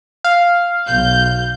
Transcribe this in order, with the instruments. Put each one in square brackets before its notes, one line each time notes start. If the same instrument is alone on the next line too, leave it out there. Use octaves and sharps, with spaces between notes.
[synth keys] F5
[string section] B1 G6